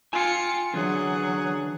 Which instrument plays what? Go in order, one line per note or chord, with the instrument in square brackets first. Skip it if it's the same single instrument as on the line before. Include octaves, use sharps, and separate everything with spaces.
[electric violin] F4 C#7 [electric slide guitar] G5 G#5
[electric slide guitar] D3 E3 D4 [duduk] F#3 [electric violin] G#4 F#5